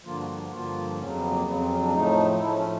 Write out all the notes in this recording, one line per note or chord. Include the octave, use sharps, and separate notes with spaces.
G2 D3 F3 A#3 F4
F#4
F#4
G2 D3 F3 A#3 F4
F2 C#3 F#3 C#4
B3
A#3
F2 C#3 F#3 B3
C4
C#4
D4
A2 F3 A3 D#4
A2 F3 A3 E4
C#4